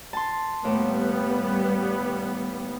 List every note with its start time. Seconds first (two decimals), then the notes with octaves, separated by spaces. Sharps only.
0.13 A5 C6
0.65 D#2 A2 G3 B3